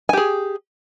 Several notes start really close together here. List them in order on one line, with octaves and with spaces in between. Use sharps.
G#5 G4 G#4